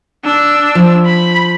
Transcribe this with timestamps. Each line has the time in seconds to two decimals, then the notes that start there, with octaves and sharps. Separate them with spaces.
0.24 D4 E6
0.75 F3
1.05 B5